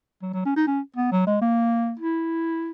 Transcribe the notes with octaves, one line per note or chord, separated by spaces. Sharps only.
F#3
F#3
C#4
D#4
C#4
B3
F#3
G#3
A#3
E4